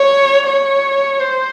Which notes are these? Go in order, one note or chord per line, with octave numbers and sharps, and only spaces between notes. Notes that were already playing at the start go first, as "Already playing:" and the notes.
Already playing: C#5
C#5
C5